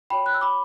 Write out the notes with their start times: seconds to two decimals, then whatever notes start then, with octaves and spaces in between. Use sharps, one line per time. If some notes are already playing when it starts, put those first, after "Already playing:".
0.10 F#4 C#5 G5 B5
0.26 F#6
0.34 E6
0.41 B5 D6